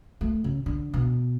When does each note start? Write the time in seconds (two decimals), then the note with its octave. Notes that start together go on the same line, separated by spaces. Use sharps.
0.21 A3
0.44 C#3
0.66 D3
0.94 B2